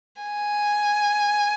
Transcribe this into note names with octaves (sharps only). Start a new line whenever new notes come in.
G#5